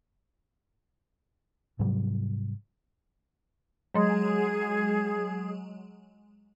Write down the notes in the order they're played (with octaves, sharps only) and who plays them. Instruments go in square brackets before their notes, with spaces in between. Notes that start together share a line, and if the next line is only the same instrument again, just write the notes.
[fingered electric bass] G#2 C3 F#3 G3
[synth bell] F#3 G#3 [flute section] G#4